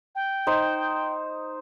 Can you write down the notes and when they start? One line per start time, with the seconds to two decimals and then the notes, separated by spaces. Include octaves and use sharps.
0.15 G5
0.47 D#4 C5